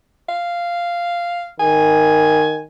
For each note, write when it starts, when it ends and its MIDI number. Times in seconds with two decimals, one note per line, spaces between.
0.29 1.48 77
1.60 2.64 51
1.60 2.59 80